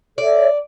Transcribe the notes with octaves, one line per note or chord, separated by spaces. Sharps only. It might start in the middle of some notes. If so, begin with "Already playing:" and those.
A4 C#5 D5 E5